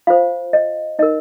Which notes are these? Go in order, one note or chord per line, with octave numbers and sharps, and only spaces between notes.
F4 C5 F5
D#5
D#4 A#4 D#5